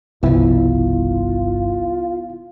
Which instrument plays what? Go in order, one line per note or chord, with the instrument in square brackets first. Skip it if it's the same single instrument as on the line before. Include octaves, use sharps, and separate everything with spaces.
[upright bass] G1 B2 [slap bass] C2 F3 [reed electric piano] B3 E4 [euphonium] F4